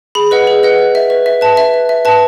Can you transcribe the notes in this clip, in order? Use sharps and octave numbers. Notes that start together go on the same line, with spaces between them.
G#4 B5
B4 D#5 F#5
G#4
B4 D#5 F#5
B4
E5
B4
E5
B4 A5
E5
B4
E5
B4 A5